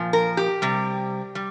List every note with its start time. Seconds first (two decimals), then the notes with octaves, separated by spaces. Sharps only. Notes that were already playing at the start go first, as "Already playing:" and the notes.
Already playing: A#2 F3
0.13 A#4
0.37 G4
0.62 C3 G3
1.35 G3